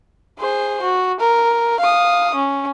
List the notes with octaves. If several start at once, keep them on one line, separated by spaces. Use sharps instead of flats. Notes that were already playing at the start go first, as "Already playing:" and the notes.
G#4 C5
F#4
A#4
F5 D#6
C#4